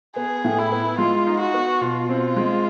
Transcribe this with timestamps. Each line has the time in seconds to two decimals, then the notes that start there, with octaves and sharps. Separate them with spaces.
0.16 B3 G#4
0.44 A2
0.58 E4
0.72 B3
0.98 G#3 F4
1.27 D#4
1.40 F#4
1.54 B3
1.81 B2 F4
2.09 C4
2.36 G#3